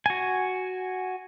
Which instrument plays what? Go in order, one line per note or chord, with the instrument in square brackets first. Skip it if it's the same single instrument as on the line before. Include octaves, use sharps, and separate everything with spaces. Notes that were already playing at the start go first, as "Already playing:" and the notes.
[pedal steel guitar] F#4 G#5